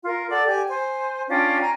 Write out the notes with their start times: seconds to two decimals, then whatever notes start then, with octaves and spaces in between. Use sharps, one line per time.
0.04 F4 A#4
0.30 A4 D5 F#5 D6
0.46 G4 G#5
0.67 C5 G#5
1.28 C#4 D4 F4 G5
1.61 G5 G#5 A#5